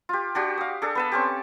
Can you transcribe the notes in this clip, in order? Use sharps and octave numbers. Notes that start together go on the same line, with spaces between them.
F4 G4
D4 F#4 G4
F5 D#6
D4 G#4 A4
B3 B4 A5
C4 C#4 G4